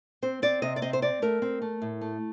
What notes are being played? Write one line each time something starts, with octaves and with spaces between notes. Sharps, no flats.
C4 C5
C4 D5
C3 D#5
D5
C4 D#5
C5
C4 D5
A3 A#4
C4
A3
A2
A3